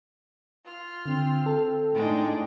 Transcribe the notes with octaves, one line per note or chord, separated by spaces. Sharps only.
F4 F6
D3 C4
A4
A2 G#3 D4 D#4 G5